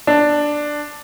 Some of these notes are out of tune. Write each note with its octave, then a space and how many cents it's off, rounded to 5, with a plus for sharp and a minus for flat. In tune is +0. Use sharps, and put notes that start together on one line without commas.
D4 +5